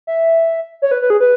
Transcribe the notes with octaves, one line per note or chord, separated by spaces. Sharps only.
E5
C#5
B4
B4
G#4
B4